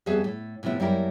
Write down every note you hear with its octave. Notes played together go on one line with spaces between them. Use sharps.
F2 G3 B3 G#4 E5 A5
A2
A2 C3 F3 B3 E4
F#2 G3 A#3 E4 G4 A#4